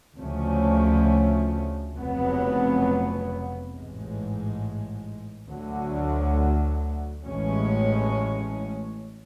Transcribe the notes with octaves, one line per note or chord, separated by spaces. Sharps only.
D2 C#3 F3 A3 C#4
F1 F2 C#3 F#3 B3
A1 G#2 G#3
D2 D3 F#3
A1 A2 G#3 C#4